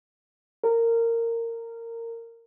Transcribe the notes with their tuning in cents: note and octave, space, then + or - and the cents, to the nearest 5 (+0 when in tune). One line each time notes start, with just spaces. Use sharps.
A#4 -20